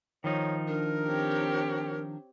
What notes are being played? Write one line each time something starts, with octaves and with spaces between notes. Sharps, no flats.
D#3 F3 D#4 C#5
D4 A#4
C4 G4 C#5